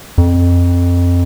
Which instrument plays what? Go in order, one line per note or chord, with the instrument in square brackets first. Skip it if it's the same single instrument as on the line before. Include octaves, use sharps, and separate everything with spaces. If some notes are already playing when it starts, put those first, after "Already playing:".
[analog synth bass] F2